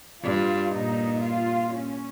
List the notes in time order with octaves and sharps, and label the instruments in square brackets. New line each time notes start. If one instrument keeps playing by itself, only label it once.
[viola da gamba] G2 [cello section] F4
[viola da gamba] A#2 [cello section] D#4
[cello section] F4
C#4